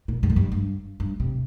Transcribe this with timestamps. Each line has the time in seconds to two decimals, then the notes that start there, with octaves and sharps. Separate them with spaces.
0.08 A#2
0.23 G2
0.30 A#2
0.36 G2
0.52 G2
1.00 G2
1.20 C3